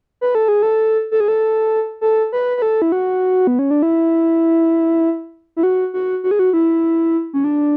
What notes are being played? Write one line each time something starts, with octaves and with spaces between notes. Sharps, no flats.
B4
A4
G#4
A4
A4
G#4
A4
A4
B4
B4
A4
E4
F#4
B3
C#4
D4
E4
E4
F#4
F#4
F#4
G#4
F#4
E4
C#4
D4